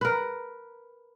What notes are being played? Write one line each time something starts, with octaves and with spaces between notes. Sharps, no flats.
A#4 B4